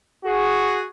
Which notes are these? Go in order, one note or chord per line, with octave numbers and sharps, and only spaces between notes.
F#4 G#4